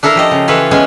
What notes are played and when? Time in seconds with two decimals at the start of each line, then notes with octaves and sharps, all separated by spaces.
0.03 D4 E4 A4 A#4 F5
0.15 F3 G4 D#5
0.31 C#3
0.48 E3 F4 A4 B4 C#5
0.71 G#3 B3 C#4 G#4 G#5